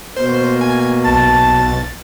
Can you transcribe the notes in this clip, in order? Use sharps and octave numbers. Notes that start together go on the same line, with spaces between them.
B2 A#3 C5
G#5
B1 A5 A6